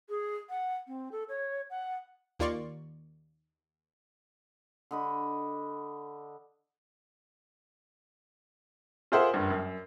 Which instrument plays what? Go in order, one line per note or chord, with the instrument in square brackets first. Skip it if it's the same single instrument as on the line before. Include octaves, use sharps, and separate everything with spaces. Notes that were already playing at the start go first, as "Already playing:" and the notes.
[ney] G#4
F#5
C4
A4
C#5
F#5
[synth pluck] D#2 A#3 F4 D5 C6 C#6
[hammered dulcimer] D3 D#5 B5
[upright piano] F4 G#4 A#4 C5 E5 F#5
F#1 G2
F#2